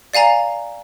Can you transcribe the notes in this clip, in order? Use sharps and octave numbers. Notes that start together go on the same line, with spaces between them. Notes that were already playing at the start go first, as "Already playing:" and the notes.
D5 F5 G#5 A#5